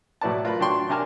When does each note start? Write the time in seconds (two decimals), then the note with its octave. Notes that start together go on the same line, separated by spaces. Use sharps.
0.21 A2 F#3 E4 B4 D5 A5
0.45 F4 A#4 B4 B5
0.60 F#3 D4 D5 G5 C6 C#6
0.89 C3 D4 A#4 G#5 A5 F6